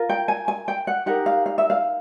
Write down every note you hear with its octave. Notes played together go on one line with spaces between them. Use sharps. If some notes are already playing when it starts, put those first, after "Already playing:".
Already playing: F4 A#4
G5
G#5
G#5
G5
F#5
D#4 G4 A#4 F#5
F5
F5
E5
F5